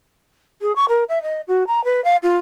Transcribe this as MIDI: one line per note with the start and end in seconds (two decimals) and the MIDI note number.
0.61 0.75 68
0.76 0.85 85
0.89 1.04 70
1.09 1.22 76
1.22 1.41 75
1.48 1.67 66
1.67 1.83 82
1.84 2.03 71
2.04 2.16 77
2.23 2.37 65